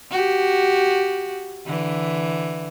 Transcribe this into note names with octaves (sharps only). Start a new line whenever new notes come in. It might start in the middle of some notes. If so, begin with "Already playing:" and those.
F#4 G4
D3 E3